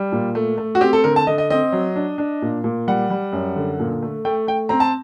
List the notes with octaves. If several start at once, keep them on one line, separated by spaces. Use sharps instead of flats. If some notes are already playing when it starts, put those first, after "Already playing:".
Already playing: G3
A#2
A3
A3
F#4
C4 G4
A4
D3 A#4
A5
D3 D#5
D#5
C4 D#5
F#3
D4
D4
A#2
A#2
G3 F#5
G3
F#2
D3
A#2
A3
A3 G5
A3 G5
C4 A#5
A5